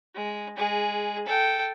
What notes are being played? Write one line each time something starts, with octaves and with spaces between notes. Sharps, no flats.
G#3
G#3 G#4
A4 G5